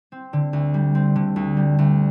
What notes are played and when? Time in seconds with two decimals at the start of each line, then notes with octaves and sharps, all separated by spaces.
0.12 C4
0.33 D3
0.53 D2
0.74 G3
0.95 C4
1.16 D3
1.36 D2
1.57 G3
1.79 D2